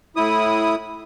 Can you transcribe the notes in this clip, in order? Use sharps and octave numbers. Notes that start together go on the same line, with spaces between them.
A2 E4 D#6